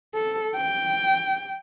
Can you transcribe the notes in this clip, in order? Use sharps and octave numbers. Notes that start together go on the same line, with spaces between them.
A4
G5